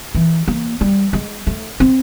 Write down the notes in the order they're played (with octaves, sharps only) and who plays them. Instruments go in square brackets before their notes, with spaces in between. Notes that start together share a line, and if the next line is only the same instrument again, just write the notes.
[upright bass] E3
A#3
G3
G#3
A3
C4